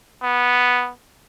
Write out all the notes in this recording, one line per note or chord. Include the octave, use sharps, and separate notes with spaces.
B3